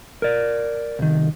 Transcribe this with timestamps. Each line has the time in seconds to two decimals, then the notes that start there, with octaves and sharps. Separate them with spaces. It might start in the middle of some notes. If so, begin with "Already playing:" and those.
0.22 A#4 D5
0.99 C2 D#3